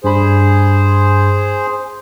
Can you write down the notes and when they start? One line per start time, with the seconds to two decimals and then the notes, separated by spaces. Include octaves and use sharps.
0.04 G2 G#4 C5 B5